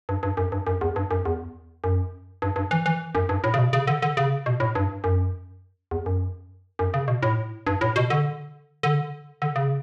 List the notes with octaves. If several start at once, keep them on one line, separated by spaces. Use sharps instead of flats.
G2
G2
F#2
G2
F#2
E2
G2
F#2
E2
F#2
G2
G2
E3
E3
F#2
G2
A2
C#3
B2
C#3
D3
D3
C#3
B2
A2
G2
F#2
E2
F#2
F#2
C#3
B2
A2
G2
A2
B2
D3
D3
D3
C#3